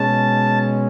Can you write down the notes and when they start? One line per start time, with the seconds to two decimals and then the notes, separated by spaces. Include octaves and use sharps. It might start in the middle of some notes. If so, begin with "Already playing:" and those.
Already playing: B2 G#3 C#4 A5